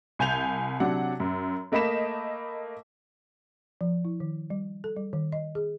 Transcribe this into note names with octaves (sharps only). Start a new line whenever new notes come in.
C2 G#5 G6 F7
C3 F#3 D4 F#5
F#2
A3 A#3 D#5 B5 B6 E7
F3
E4
D#3
G3
A4
G3
D#3
D#5
G#4